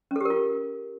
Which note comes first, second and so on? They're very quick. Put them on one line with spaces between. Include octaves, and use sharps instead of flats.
C#4 A4 G4 A#4 F4